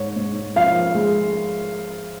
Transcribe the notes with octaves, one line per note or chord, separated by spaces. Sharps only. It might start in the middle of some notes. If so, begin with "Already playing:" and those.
Already playing: G#2 C#5
G#2
F3 F5
G#3